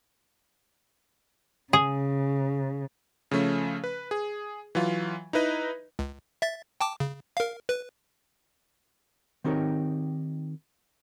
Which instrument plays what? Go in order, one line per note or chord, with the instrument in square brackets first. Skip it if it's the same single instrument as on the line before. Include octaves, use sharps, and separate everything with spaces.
[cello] C#3 [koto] G#4
[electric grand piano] C#3 F3 A3 C#4
B4
G#4
E3 F#3 F4
D#4 E4 B4 D#5
[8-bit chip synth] C#2
E5 A6
G5 A5 D6
C#3
A#4 F5
B4
[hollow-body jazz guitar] D#3 C4 D#4 G4 A#4 C#5